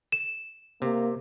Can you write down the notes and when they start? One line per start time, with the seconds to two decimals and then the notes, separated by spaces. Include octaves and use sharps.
0.12 E7
0.82 C3 A#3